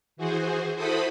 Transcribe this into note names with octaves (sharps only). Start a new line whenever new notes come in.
E3 F#4 G#4 C5
E4 F#4 A4 C5 B5 D#6